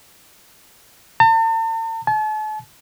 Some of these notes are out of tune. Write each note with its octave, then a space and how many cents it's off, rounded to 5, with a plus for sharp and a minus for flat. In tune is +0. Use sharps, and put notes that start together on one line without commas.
A5 +45
A5 -40